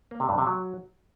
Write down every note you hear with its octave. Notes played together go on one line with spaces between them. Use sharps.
A#3
C3
G2
C3
F#3